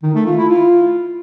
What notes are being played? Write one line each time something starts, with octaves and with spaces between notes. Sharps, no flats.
D#3
A3
F4
E4
F4